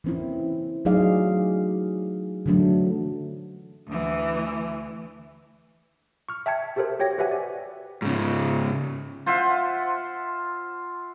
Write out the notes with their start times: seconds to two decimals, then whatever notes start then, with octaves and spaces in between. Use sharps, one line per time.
0.04 E3 A#3 C4 C#4 E4
0.85 F#3 A3 D#4 G#4 D5 F5
2.46 D3 E3 F#3 A3 D4
3.88 D2 E3
6.29 C#6 F6
6.46 E5 G5 A5 G#6 C#7
6.76 F#4 G4 A4 A#4 C5 E5
6.99 F#4 G4 C#5 G5 A#6
7.18 F#4 G4 B4 E5 F#5 G#5
7.31 D5
8.02 G#2 C#3
9.26 F4 C5 E5 F#5